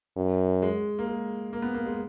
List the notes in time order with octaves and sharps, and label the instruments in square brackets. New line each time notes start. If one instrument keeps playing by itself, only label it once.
[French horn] F#2
[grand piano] G#3
A#3
G#3
A#3
B3
A#3
G#3